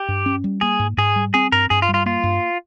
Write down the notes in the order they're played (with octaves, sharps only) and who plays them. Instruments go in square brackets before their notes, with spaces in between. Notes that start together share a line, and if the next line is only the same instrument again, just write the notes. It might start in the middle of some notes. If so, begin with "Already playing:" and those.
Already playing: [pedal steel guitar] G4
[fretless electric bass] G2
C#4
G3
[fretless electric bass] A#3 [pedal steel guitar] G#4
[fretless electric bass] G#2
[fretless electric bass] G#2 [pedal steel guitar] G#4
[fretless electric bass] G3
[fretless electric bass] C4 [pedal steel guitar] G#4
[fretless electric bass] G2 [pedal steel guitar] A#4
[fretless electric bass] G2 [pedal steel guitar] G#4
[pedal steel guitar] F4
[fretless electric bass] G3
[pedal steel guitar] F4
[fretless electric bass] A#3 [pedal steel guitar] F4
[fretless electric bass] G2